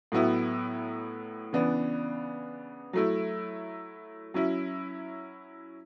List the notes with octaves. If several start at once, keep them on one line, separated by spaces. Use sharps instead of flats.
A2 F#3 B3 E4
C#3 E3 B3 D4
F#3 A3 E4
F#3 C#4 E4